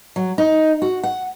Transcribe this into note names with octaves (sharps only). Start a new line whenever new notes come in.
F#3
D#4
F#4
F#5